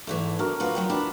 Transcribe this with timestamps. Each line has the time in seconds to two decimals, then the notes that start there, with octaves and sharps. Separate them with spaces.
0.07 E2 G#2 E3 A3
0.39 D3 F#4 A#4
0.60 D3 F3 F4 B4 F#5 C#6
0.75 D#2 F#3 G5
0.90 D4 E4 B4